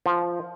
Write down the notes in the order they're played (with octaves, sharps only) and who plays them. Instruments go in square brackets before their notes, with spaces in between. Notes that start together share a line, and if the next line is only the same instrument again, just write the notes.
[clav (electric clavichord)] F3